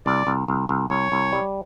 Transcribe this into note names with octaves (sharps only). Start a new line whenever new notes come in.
C2 D5
C2
C2
C2
C2 C#5
C2
G3